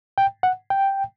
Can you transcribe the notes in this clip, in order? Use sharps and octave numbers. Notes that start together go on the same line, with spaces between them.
G5
F#5
G5